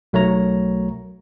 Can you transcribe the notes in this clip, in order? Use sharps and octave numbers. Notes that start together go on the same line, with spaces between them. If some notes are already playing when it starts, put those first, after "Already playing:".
B1 F#3 A3 A#4 C#5 A#5